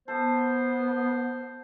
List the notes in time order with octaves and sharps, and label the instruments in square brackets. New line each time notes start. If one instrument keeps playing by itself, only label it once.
[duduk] B3 [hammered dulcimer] A4 [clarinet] C5